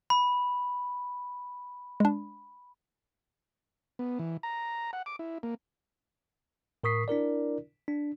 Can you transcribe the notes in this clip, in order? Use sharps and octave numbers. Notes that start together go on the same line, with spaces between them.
B5
G#3 D4
B3
E3
A#5
F#5
D6
E4
A#3
A2 A#4 C#6 D#6 B6 C7
D4 E4 A#4 D5
D4